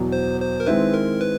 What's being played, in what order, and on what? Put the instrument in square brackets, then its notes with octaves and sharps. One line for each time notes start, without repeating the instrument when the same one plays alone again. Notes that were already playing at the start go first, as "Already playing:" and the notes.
Already playing: [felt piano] E2 B2 F#3
[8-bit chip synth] C5
C5
A#4
[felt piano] D#3 G#3 C4 E4 [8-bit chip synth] B4
[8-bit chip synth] A#4
B4